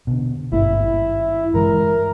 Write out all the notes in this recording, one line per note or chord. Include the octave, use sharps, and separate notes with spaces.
B2 D3
G#1 G2 A#3 E4
G2 E3 G#3 A#4